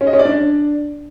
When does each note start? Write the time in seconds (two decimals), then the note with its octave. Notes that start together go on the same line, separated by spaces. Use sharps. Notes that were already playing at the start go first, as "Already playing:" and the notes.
0.01 C#4
0.07 D#5
0.13 C#4
0.19 D5
0.25 D4